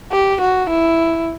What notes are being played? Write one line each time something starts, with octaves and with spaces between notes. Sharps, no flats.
G4
F#4
E4